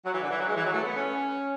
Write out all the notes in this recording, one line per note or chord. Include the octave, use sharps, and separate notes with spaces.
F#3
E3
D3
E3
F#3
G#3
E3
F#3
A3
B3
C#4